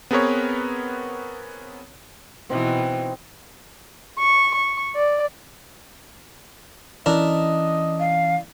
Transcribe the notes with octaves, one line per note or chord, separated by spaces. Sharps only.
B3 C4 G#4 A#4 B4 C#5
B2 E3 C4 D#4
C#6
C#6
D5
E3 C#4 D4 E4 A#4 D#5 A5
F5